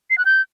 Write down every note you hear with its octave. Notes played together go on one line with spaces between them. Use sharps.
C7
F#6
G6